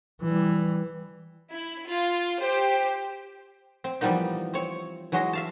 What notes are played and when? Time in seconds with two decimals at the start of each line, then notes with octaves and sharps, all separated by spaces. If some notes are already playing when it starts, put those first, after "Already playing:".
0.23 E3 G3
1.50 E4
1.87 F4
2.38 G4 C5
3.84 C4
4.01 E3 F3 G3 A#3 B3 D#4
4.54 C4 C#5
5.12 E3 F#3 G#3 F#4 D#5
5.33 E5 F5 A5